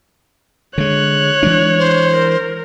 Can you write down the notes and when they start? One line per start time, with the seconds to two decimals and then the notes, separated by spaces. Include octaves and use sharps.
0.78 D3 G#3 C#5 F#6
1.43 E3 G#3 D4
1.79 C5
2.16 A#4